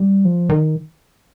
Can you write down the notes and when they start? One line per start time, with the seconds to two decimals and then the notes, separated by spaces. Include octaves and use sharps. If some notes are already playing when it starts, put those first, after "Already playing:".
Already playing: G3
0.25 F3
0.49 D#3